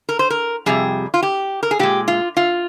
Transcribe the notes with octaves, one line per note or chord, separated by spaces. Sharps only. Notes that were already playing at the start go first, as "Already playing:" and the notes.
A#4
C5
A#4
F2 C3 G3 G#4
F4
G4
A#4
G#4
A#2 G#3 G4
F4
F4